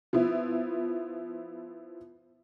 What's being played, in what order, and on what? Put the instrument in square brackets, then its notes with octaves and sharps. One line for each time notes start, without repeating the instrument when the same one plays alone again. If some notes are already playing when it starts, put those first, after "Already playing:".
[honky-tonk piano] F3 B3 E4